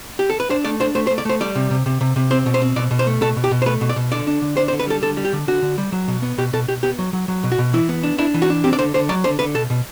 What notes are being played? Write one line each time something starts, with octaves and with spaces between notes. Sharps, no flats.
G4
A4
B4
D4 C5
A3 D5
D4 C5
A3 C5
C5
A3
D5
A3 C5
G3 D5
C3
C3
C3
C3
C3
C4 C5
B2
C5
C4
B2 D5
B2
C5
A3
B2 A4
B2
G4
B2
C5
A3 B4
B2
D5
B2
D3 D5
D4
D3
D4 C5
C5
D3
B4
G3 A4
D3 A4
G3
G4
D3
D3 F#4
D3
G3
F#3
B2
B3
B2 G4
B2 A4
B2 G4
B3 G4
F#3
F#3
F#3
B2
F#4
B2
E3 E4
B3
D4
D4 E4
E3
F#4
D4
C4 G4
D5
D3 C5
D3 C5
F#3 D5
D3 C5
D3 B4
B2 A4
B2